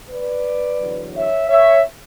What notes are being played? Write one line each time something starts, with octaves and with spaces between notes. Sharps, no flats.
B4 D5
E2 D3 F#3
C#5 E5
C#5 E5